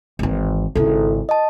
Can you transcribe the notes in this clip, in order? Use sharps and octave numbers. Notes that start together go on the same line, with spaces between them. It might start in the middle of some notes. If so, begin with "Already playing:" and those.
G#1 E3
G#1 C#3 E4 A4
D#5 A5